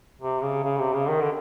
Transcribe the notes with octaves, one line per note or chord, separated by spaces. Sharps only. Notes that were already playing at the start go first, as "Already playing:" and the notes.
C3
C#3
C#3
C3
C#3
D#3
D3